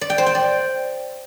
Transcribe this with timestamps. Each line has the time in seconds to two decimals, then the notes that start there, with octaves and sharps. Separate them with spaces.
0.01 D5
0.10 G5
0.18 C5
0.26 G5
0.35 D5